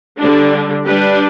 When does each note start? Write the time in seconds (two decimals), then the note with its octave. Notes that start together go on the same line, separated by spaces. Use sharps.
0.17 D3 G3 D4
0.84 G3 D4 G4 B4